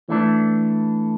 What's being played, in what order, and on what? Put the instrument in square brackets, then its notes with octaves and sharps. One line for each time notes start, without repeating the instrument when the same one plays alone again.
[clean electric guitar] E3 A3 D4